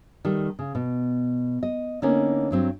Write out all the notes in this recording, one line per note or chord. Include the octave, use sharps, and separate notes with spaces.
D#3 G3 A3
C#3
B2
D#5
D3 A#3 B3 C#4 D#4 A#4
G2 F#3 C4